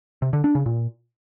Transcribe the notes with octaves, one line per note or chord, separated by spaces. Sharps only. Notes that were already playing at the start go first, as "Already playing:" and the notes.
C3
D3
D4
C#3
A#2